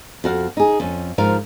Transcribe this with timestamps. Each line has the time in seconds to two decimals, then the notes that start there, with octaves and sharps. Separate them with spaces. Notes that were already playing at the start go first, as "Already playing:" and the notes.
0.24 F2 F#4 F5
0.57 D#4 G#4
0.80 F2 C#4
1.18 G#2 F3 A#4 F5